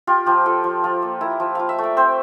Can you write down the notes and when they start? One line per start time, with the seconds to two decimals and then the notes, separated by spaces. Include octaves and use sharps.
0.07 F4 G4
0.26 F3 G4
0.46 F4 A4
0.64 F3
0.84 F3
1.02 A#3
1.21 E4 A#4
1.40 F3
1.55 F4 F5
1.69 E5
1.78 A3
1.84 D5
1.97 C4 C5